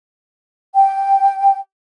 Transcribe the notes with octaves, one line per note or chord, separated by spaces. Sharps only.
G5